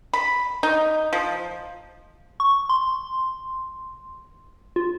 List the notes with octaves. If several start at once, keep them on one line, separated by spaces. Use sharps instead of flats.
B5
D#4
F3
C#6
C6
F4